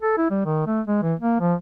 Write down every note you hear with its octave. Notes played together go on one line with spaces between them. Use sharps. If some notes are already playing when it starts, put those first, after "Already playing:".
A4
E4
G3
D#3
A3
G#3
E3
A#3
F3